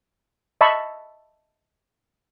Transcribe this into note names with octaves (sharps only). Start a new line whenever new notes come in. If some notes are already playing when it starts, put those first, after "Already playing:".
D#5 E5 A5 B5 C#6